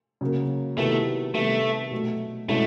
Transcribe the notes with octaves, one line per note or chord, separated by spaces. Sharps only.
C#3 F#3 A#3
C3 D#3 F#3 A3 B3 E4
C3 D#3 G3 A3 B3
B2 F#3 A3
B2 G#3 A3 C#4 E4